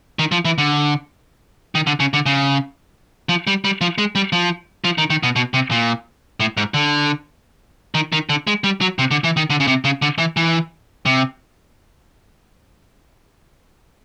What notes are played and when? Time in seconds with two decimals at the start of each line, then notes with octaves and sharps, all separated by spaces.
0.19 D#3
0.32 F3
0.45 E3
0.58 D3
1.75 D#3
1.87 D3
2.00 C#3
2.13 D3
2.26 C#3
3.29 F3
3.47 G3
3.65 G3
3.81 F3
3.98 G#3
4.15 G3
4.32 F3
4.84 F3
4.98 D#3
5.10 D#3
5.23 B2
5.36 B2
5.54 C3
5.71 A#2
6.40 A2
6.57 G#2
6.74 D3
7.95 D#3
8.12 D#3
8.29 D3
8.47 G#3
8.64 G3
8.81 F#3
8.99 C3
9.11 D3
9.24 E3
9.37 D#3
9.50 D3
9.60 C#3
9.67 C3
9.84 C#3
10.02 D3
10.18 E3
10.37 E3
11.06 C3